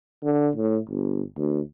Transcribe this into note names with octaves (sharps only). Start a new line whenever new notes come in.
D3
A2
G1
D2